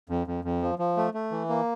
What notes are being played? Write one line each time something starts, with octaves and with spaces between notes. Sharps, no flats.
F2
F2
F2
F3
F3
A3
A3
E3
A#3